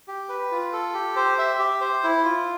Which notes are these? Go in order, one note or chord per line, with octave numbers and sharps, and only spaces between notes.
G4
B4
F4
A4
G4
C5
E5
G4
C5
E4
F4